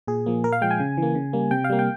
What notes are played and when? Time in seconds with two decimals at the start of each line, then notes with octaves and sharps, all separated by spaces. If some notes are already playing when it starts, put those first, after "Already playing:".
0.07 A#2 G#4
0.26 F3 A#3
0.44 A#2 A#4
0.52 F5
0.61 F3 G#3 G5
0.71 G#5
0.80 C#3
0.97 E3 A#3
1.15 C#3
1.33 G3 A#3
1.51 C3 G5
1.64 F5
1.70 G3 A#3
1.79 G5